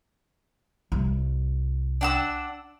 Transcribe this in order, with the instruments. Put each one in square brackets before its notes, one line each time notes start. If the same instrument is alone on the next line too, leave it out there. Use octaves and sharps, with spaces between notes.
[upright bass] C2
[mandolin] D4 F#5 E6